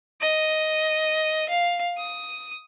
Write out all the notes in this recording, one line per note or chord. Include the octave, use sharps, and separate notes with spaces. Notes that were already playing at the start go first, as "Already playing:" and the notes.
D#5
F5
D#6